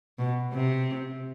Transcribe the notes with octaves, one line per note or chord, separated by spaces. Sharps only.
B2
C3